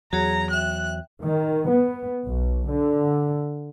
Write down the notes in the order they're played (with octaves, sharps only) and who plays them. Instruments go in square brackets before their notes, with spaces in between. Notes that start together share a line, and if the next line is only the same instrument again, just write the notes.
[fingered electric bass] E2 [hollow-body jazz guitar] F#3 [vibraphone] F#4 G#4 C#5 [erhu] A#5
[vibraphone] E5 G5 [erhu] F#6
[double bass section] D#3
B3
B1
D3